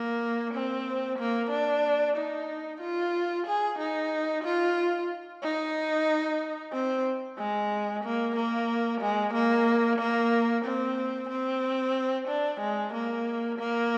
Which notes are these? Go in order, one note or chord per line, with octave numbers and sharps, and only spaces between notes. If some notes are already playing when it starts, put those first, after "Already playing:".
Already playing: A#3
C4
A#3
D4
D#4
F4
G#4
D#4
F4
D#4
C4
G#3
A#3
A#3
G#3
A#3
A#3
C4
C4
D4
G#3
A#3
A#3